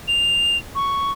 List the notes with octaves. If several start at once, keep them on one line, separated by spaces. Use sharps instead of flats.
F7
C#6